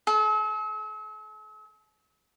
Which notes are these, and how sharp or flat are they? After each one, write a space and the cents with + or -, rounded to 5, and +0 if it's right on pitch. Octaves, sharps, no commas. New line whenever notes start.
A4 -45